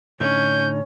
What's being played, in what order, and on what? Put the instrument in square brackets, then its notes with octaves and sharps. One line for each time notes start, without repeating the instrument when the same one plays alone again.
[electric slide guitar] A2 D3 D#4 [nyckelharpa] C#4 [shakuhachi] C#5 [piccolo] G6